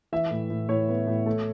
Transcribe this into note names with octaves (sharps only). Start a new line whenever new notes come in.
E3 E5
A2
A2
A2 C#5
B3
A2
A3